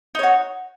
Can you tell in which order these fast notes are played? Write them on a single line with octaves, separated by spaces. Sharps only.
D#4 C#5 F#4